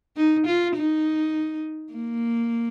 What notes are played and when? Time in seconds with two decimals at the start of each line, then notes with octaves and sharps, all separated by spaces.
0.16 D#4
0.47 F4
0.76 D#4
1.93 A#3